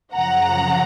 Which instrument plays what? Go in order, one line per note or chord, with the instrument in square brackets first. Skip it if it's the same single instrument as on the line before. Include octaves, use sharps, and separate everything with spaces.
[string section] F#2 C#3 F3 F#5 A#5